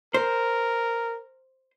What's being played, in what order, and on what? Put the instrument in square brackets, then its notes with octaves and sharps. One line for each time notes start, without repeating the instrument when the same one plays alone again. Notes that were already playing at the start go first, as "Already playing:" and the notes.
[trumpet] A#4 [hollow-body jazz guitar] C5